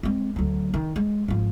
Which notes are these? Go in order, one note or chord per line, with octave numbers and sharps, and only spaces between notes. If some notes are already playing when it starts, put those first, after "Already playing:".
G#3 C4
D2 F#3
D#3
G#3
G#1 F3